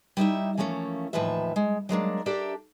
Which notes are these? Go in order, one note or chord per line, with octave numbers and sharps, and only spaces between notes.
G3 D#4 E4 E5
E3 F3 A3 A#3 C#4
D#2 A2 E3 F3 B4 E5
G#3
F#3 G#3 A#3 D4
D4 G4 A4 A#4 D5 E5